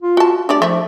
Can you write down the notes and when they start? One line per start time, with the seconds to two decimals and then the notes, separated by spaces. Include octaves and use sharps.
0.02 F4
0.17 F#4 A5
0.49 A3 D4 G4 D5
0.62 F3 A3 E4